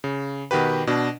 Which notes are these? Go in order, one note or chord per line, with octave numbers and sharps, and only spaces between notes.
C#3
B2 D#3 F#4 G4 B4
B2 D4